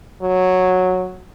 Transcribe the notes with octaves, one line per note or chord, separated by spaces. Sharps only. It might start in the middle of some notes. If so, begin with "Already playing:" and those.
F#3